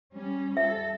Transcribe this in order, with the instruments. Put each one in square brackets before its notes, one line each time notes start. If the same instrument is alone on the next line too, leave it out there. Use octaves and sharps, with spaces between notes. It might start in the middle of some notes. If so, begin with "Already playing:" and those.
[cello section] G3 C#4
[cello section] A4 [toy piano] E5